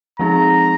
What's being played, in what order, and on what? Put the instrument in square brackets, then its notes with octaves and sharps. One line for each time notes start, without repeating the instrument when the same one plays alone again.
[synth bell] F3 G#3 C4 D#4 G#4 [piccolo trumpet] A#5